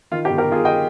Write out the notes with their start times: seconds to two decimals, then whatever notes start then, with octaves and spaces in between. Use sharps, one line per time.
0.11 D#3 F4
0.25 G4
0.29 G1
0.38 G4 A#4
0.47 G1 F4 G#4
0.65 D#5 G5